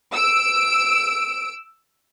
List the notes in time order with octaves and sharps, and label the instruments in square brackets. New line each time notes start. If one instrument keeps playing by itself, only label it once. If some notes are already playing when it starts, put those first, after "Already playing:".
[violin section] E6 D7